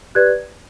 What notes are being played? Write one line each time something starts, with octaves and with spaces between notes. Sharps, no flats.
G4 B4 D5 F#6 G#6